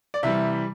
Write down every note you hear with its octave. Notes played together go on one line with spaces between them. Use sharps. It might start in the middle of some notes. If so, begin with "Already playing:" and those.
D5
C3 E3 G3 E5